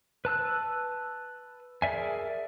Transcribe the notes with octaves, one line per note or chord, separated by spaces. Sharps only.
B4 A5 E6 F#6
G#4 A#4 D5 E5 G#5